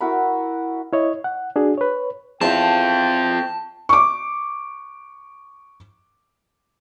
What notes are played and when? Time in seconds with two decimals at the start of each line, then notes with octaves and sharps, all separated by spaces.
0.01 E4 F#4 A#4 B5
0.93 E4 C#5 D#5
1.24 F#5
1.56 D4 F#4 G#4
1.77 B4 C#5
2.41 E2 C4 F4 G5 A5
3.89 C#6 D6